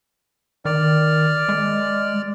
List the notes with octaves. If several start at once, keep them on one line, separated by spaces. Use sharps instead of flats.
D#3 D5 F6
G#3